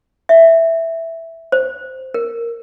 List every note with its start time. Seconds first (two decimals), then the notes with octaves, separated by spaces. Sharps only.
0.29 E5
1.52 C5
2.14 A#4